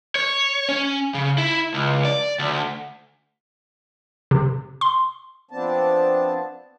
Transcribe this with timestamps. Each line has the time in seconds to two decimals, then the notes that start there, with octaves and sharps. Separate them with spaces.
0.15 C#5
0.69 C#4
1.14 C#3
1.38 E4
1.74 C#2
2.05 D5
2.39 D2
4.31 C3
4.81 C6
5.51 F3 B3 C4 D4 A5